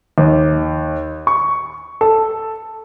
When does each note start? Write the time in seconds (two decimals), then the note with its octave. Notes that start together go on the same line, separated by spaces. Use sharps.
0.18 D#2
1.27 C#6
2.01 A4